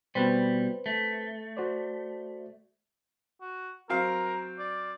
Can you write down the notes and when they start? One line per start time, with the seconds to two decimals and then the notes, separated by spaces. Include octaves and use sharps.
0.15 B2 G3 C4 B4 C5
0.86 A3
1.57 F#4 C5 D5
3.41 F#4
3.89 F#3 C4 A#4 F5
4.59 D5